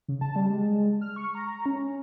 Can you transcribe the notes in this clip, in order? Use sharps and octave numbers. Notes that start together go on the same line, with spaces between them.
C#3
A5
G3
G#3
F6
C#6
A#5
C#4